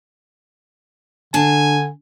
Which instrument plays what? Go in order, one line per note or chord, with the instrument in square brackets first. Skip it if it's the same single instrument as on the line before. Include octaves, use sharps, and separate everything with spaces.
[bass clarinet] D3 [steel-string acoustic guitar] D4 A5 [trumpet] G#5